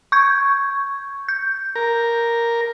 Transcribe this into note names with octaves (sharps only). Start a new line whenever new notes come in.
C#6 G6 G#6
G6
A#4